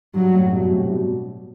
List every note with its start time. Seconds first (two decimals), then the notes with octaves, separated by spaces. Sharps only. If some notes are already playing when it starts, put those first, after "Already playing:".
0.14 G2 F#3
0.33 F#2 A2
0.52 G2 B2
0.71 A2 C3
0.89 G2 B2